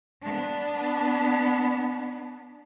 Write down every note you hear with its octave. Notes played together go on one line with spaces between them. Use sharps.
B3 D4